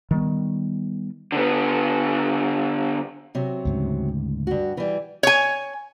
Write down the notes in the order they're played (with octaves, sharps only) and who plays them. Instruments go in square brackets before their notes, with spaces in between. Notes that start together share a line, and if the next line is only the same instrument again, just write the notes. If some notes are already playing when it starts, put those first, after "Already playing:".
[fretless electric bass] D#3 G3 B3
[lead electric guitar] D3 B3
[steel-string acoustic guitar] C3 F#3
[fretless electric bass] D2 G#2 C#3
[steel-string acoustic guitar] G2 F#4
E3 G3
[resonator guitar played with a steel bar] C#5 G#5